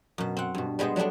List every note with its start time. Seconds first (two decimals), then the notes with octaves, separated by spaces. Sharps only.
0.18 F#2 B2
0.37 C4 F#5
0.55 G2 B2
0.79 G3 G#3 B3 G#4 C5
0.96 F#3 G3 A3 B3 D4